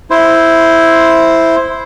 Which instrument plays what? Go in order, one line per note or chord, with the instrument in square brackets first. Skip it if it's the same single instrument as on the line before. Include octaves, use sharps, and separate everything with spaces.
[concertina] E4 C5